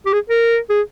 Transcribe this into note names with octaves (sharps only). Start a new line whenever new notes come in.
G4
G#4
A#4
G#4